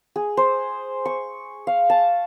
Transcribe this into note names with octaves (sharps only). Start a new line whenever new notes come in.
G#4
C5
C#6
F5
A5